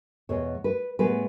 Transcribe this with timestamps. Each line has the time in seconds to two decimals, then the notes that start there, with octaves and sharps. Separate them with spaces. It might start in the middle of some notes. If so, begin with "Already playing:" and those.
0.29 E2 B2 G#3 B3 C#5
0.64 B4
0.99 A2 G#3 B3 B4